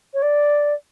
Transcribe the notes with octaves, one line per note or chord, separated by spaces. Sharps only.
C#5
D5